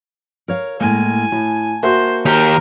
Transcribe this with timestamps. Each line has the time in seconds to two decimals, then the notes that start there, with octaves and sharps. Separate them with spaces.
0.48 A#4 C#5 F5
0.80 A2 G#3 A#3 G#5
1.32 A2 A5
1.83 A#3 F#4 C5 E5
2.25 D#2 G4 A#4